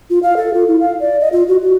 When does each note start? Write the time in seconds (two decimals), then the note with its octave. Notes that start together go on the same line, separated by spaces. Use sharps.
0.10 F4
0.23 F5
0.37 A4
0.54 F4
0.68 E4
0.80 F5
1.00 D5
1.21 D#5
1.32 F4
1.48 F#4
1.62 F#4